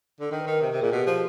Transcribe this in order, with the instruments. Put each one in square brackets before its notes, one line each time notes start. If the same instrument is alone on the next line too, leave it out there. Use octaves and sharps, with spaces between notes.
[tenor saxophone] D3
[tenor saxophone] D#3 [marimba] A#4
[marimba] B4
[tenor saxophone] D#3 [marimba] A#4
[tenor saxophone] C3
C3
[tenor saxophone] A#2 [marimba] G#4
[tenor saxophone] B2 [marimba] G4
[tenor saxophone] F3